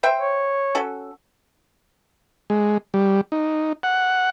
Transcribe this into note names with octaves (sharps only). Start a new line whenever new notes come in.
C5 E5 G5
C#5
C#4 F#4 A4
G#3
G3
D#4
F#5